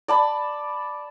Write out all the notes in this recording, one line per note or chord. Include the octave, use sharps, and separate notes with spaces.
D5 A5 B5